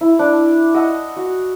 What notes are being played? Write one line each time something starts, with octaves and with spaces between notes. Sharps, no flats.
E4
D4
D#5 F#5 D#6 E6
F#4